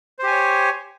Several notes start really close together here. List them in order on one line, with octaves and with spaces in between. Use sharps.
C5 G4 G#5 C#5